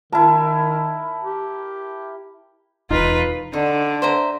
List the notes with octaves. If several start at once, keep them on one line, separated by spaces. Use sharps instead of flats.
D#3 E4 A#4 A5
G4
E1 E2 D#4 F4 B4
D3 D#4
C5 E5 A#5